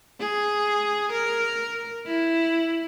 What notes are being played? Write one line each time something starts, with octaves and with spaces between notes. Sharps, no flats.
G#4
A#4
E4